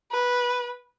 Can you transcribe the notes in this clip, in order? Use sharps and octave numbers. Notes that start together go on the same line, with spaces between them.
B4